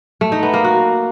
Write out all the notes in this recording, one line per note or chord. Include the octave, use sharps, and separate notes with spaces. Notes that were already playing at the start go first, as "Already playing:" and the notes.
A3
D#4
B3
A#3
F#4